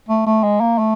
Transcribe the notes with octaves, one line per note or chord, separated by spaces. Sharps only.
A3
A3
G#3
A#3
A3